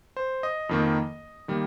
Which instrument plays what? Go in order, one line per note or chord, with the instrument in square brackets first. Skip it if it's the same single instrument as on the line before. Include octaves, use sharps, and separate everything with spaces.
[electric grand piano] C5
D#5
F2 D#3 A#3
D#3 G3 A#3